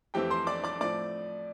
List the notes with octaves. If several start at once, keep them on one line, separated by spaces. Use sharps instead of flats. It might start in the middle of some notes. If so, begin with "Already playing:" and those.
F2 E3 A3 C4 G4 G5
C5 C6
D5 D6
D5 D6
A2 F3 C4 D5 D6